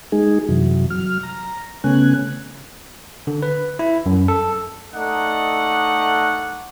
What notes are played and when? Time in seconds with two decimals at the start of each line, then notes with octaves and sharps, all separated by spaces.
0.12 G#3 D#4 G#4
0.49 F#2 C3 E3 F#3
0.90 F#3 F6
1.23 A#5
1.84 C#3 A3 B3 C#4 G#5 F#6
3.27 D3
3.42 B4
3.79 E4
4.06 F#2
4.28 A4
4.94 A3 D#4 D5 D#5 F#5